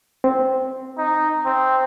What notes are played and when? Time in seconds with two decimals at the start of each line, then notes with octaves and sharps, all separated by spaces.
0.24 C4
0.98 D#4
1.46 C4